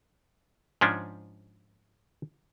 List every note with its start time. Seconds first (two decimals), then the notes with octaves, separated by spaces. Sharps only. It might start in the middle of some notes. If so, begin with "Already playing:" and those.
0.81 G#2 F3 C#4 D4